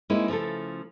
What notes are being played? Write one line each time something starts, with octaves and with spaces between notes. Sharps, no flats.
G#3 A#3 C4 C#4 D#4 E4
C#3 F3 A3 E4 A4